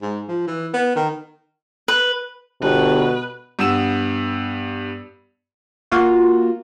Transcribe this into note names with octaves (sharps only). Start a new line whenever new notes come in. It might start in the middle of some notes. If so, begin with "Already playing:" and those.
G#2
F3
E3
B3
D#3
B4
G1 B2 B4
G2 B3 E6 E7
A#3 F4 F#4